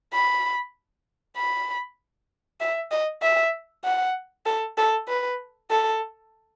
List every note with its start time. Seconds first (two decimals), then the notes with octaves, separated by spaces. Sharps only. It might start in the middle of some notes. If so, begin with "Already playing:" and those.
0.13 B5
1.37 B5
2.60 E5
2.91 D#5
3.22 E5
3.84 F#5
4.46 A4
4.78 A4
5.08 B4
5.71 A4